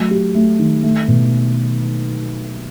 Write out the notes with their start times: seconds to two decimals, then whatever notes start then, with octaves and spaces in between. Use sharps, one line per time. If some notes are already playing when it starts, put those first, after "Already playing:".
Already playing: F#3 A3
0.11 G4
0.35 A3
0.59 D#3
0.83 A3
1.08 B2